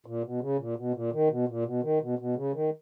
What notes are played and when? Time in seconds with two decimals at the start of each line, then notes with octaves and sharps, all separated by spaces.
0.06 A#2
0.24 B2
0.41 C#3
0.58 A#2
0.76 B2
0.94 A#2
1.12 D#3
1.29 B2
1.48 A#2
1.65 B2
1.83 D#3
2.01 B2
2.19 B2
2.36 C#3
2.54 D#3